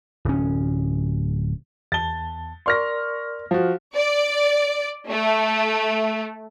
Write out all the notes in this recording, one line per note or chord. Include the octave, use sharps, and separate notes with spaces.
D1 C#4
E2 A5 A6 G7
A#4 D5 C6 C#6 F6 A#6
F3 F#4 F5
D5
A3